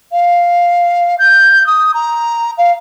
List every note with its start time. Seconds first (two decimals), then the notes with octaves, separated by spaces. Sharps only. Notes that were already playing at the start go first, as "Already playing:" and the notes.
0.12 F5
1.18 G6
1.66 D#6
1.94 A#5
2.57 F5